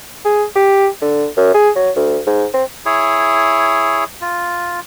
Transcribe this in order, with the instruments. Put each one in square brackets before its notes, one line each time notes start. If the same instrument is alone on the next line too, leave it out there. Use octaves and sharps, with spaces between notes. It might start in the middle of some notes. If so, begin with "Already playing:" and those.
[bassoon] G#4
G4
D3
F#2
G#4
F#3
D2
G#2
C4
[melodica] E4 G#4 C#5
F4